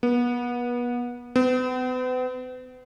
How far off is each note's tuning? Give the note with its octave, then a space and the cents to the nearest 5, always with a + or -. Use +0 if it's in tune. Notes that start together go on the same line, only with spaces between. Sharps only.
B3 -30
B3 +45